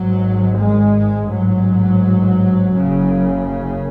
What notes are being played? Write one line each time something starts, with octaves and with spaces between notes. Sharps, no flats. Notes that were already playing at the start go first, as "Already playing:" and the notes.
Already playing: G#1 G#2 F#3
G#3
A1 G#2 F#3
F#1 F#2 C#3